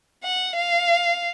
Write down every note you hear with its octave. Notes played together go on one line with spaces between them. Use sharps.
F#5
F5